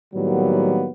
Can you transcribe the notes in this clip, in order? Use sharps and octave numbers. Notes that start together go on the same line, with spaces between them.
A2 D#3 F#3 G3 A#3 B3